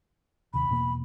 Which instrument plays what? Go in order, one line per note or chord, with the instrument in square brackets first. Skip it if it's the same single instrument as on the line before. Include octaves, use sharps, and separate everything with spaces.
[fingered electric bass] D#2 C3 [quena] B5
[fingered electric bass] E1 B2 A#3